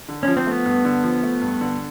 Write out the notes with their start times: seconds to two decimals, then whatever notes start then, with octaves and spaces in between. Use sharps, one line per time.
0.08 D3
0.23 F3 C#4
0.37 C4
0.46 A3 B3
0.66 G2
0.85 D3
1.04 F3
1.23 A3
1.42 G2
1.61 D3